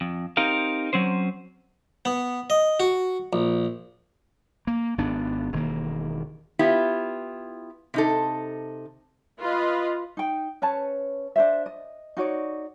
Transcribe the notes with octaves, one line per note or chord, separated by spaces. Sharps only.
F2
C4 D#4 G4 A#4 F5
F#3 C4 C#4 C5
B3
D#5
F#4
A#1
A#3
G#1 B3 D4
E1 D#3 A#3
B3 E4 F4 G4
C3 D#4 A4
F4 B4 D#5
D#4 G5
C#4 B4 C#5 A5
D4 C5 E5
D#5
D#4 F#4 C#5 D5